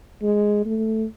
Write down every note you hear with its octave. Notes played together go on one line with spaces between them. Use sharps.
G#3
A3